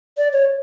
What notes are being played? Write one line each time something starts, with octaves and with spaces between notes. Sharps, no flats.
D5
C#5